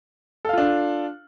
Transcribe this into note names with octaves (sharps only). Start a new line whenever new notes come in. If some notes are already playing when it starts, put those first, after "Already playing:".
D4 F4 A4 F5